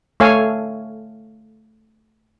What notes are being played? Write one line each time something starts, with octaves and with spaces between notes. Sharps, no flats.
A3 A4 C#5 F5 G#5